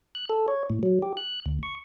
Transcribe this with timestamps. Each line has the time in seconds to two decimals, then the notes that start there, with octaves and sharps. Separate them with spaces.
0.15 F#6
0.30 A4
0.48 C#5
0.70 A2
0.83 F#3
1.02 G4
1.17 F#6
1.46 D2
1.63 C#6